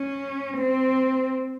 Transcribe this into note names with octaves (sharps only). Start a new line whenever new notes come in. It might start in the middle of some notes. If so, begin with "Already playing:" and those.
Already playing: C#4
C4